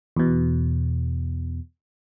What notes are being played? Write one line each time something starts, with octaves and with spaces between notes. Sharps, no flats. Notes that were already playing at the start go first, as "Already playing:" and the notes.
E2 B2